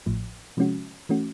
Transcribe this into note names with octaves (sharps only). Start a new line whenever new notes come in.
A1 A2 F3
C3 F3 G#3 C#4 F#4
E3 A3 C#4 F#4